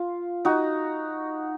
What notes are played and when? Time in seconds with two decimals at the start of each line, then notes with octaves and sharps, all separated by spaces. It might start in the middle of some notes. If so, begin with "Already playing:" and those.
Already playing: F4
0.45 D#4 F#4